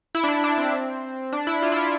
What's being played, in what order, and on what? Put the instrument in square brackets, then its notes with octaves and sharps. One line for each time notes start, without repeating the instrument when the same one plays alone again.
[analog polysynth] E4
D4
E4
D4
C4
D4
E4
F4
E4
F4